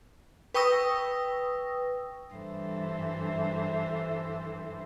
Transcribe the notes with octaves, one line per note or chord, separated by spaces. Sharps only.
B4 G5 C#6 D#6 E6 A#6
G2 E3 A4 C5 E5